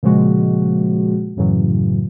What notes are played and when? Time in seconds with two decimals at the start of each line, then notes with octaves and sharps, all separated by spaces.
0.03 A#2 C#3 F3 G#3 F#4
1.37 F#2 A2 C#3 E3 F#3